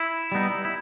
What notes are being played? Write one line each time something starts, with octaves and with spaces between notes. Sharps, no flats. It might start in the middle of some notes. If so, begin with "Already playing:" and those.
Already playing: E4
G3 B3 D#4
E4